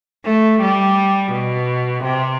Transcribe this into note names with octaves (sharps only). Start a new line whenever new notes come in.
A3
G3
B2
C3